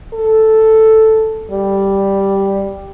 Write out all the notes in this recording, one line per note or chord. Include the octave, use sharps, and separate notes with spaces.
A4
G3